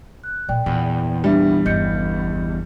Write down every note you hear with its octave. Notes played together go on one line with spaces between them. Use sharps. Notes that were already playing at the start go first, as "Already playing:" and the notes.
F#6
A#2 D5 G5
E2 A#2
G3 D4 E5
G1 C#3 D#5 G6 C#7